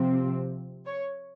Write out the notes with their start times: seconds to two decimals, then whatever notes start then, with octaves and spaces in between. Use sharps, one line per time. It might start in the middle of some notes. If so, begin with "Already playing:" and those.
Already playing: C3 F3 C4
0.86 C#5